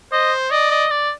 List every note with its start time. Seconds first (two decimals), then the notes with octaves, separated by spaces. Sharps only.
0.12 C5 D#5
0.51 D5 D#5
0.71 D#5
0.91 D5